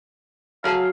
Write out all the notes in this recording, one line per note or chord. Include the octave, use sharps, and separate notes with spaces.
F#3 E4 G#4 A4 F5